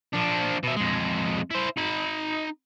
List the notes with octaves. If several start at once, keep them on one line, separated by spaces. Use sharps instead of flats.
F3 D4
B2 E5
F2 G#3
E4 C5
D#4 B5